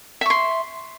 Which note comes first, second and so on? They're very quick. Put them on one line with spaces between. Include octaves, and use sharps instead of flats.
E5 C#6 C6